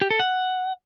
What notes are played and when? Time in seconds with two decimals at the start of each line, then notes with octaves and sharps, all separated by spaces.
0.01 G4
0.11 A4
0.20 F#5